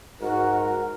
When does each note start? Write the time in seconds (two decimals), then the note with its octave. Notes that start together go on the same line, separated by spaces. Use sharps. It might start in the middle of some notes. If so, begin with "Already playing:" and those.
0.21 G#2 F#4 A#4